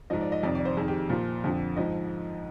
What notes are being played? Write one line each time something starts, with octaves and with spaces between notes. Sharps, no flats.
G#2 F3 D#5
D5
D#5
F2 C3 D#3 D5
D5
C5
F2 D#3 G#4
G4
A#2 F3
F2 D3 F3
G#2 F3 D#5